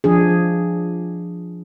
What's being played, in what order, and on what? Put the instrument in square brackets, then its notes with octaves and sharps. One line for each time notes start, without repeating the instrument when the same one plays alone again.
[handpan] F3 D4 G#4